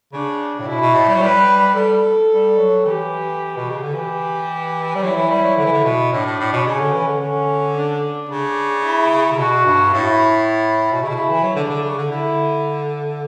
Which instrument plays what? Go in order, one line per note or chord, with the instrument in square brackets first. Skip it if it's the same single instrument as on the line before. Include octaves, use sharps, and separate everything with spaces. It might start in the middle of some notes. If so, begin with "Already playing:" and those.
[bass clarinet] C#3 [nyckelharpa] D4
[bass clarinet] A2
[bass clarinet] B2 [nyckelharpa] E4
[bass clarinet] B2
A2
G3
F#3
[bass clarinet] G3 [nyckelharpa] B4
[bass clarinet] G3 [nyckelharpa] A4
[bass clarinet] G3
F#3
[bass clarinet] E3 [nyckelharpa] G4
[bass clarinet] B2
C#3
D3
[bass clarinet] E3 [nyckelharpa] G4
[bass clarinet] G3
[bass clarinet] F#3 [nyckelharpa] E4
[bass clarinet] E3
G3
F#3
D3
E3
D3
B2
[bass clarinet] A2 [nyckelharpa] D4
[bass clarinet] A2
A2
B2
[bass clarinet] C#3 [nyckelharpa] C#4
[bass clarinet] D3
E3
D3
[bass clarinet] D3 [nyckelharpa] C#4
[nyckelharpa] D4
[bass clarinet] C#3 [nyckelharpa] D4
[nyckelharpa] E4
[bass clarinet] C#3
[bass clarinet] B2 [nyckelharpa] F#4
[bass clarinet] G2
[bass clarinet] A2 [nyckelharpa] E4
[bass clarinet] B2
[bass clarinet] C#3 [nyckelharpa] E4
[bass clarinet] B2
C#3
E3
F#3
[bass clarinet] D3 [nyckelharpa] D4
[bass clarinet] C#3
D3
C#3
D3
[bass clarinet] D3 [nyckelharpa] E4